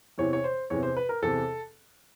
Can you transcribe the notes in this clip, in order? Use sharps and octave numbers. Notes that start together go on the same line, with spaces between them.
E2 C3 E3 C#5
C#5
C5
E2 C3 E3 C#5
C5
B4
A#4
E2 C3 E3 A4